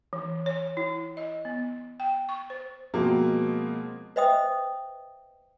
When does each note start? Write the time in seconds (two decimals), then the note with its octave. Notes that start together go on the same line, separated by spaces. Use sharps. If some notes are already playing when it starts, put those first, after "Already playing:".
0.13 E3
0.46 C#5
0.77 E4
1.17 D#5
1.45 B3
2.00 G5
2.29 C#6
2.50 C5
2.94 B2 F3 G#3 A#3 C4
4.16 B4 C5 D#5 E5 G5 D#6